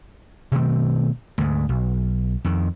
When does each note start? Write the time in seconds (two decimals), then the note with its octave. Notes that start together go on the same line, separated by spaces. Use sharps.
0.52 B2 D#3 A3 C4
1.38 D2 G#2
1.69 B1
2.45 F2 D#3